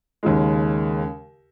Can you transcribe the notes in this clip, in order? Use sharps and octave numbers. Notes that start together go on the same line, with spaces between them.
D#2 C#3 G#3